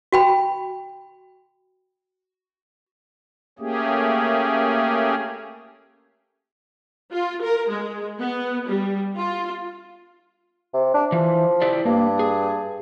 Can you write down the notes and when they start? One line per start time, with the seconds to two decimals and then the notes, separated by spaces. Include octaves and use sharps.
0.12 F#4 G5 B5
3.59 A3 A#3 C#4 G4 G#4
7.14 F4
7.43 A#4
7.72 G#3
8.20 B3
8.68 G3
9.16 F4
10.74 C3
10.94 D4
11.12 E3 F3
11.62 E4 G4 D5
11.85 G2 A#3
12.19 G#4